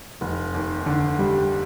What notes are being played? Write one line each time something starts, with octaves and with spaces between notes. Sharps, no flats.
F1
D#2
D3
G3